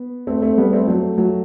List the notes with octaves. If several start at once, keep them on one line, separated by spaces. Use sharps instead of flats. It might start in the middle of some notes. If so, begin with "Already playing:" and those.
Already playing: B3
A3 C4
A3 C4
G3 B3
A3 C4
F#3 A3
F#3 A3